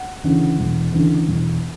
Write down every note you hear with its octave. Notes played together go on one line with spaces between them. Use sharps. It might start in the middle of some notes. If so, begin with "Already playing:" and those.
Already playing: F#5
D2 C#3 E3
E1
D2 C#3 E3
E1